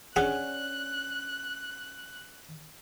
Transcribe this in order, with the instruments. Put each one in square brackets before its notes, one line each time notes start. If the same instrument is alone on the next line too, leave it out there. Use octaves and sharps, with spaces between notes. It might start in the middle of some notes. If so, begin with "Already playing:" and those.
[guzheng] C#4 D4 [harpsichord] G#4 [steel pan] F#5 [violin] F#6